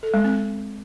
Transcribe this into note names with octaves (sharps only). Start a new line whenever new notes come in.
A4
G#3
C4